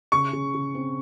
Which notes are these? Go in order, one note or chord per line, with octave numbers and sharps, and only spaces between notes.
C#3 C#6
C#3
C#3
C4